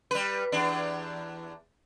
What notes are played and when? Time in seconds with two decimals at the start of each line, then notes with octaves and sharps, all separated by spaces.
0.11 G3 B4
0.52 E2 D4